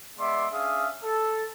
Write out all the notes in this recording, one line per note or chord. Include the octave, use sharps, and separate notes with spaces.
G#3 B3 D5 E5 C6 D6
C#4 D4 G#4 E5 F5 D#6
A4